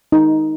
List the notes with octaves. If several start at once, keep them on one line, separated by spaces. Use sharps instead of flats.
D#4